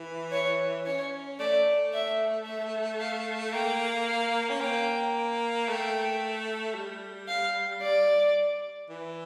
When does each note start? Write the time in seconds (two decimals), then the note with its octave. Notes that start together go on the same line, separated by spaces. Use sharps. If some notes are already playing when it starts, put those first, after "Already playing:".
Already playing: E3
0.32 C#5
0.86 C#4 C#5
1.39 A3 D5
1.93 E5
2.46 E5
3.00 F5
3.53 A#3 G5
4.07 F5
4.50 C#4
4.61 A#3 G5
5.68 A3 G5
6.75 G3
7.28 F5
7.82 D5
8.89 E3